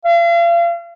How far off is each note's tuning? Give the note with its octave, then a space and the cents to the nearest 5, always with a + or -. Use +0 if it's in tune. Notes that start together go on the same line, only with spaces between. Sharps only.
F5 -40